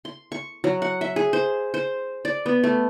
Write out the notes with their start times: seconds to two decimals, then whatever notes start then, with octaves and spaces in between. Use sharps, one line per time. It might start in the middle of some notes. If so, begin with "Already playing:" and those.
0.05 C6
0.32 C#6
0.64 F#3
0.82 F#5
1.01 E5
1.16 G#4
1.33 C5
1.74 C5
2.25 D5
2.46 B3
2.64 A3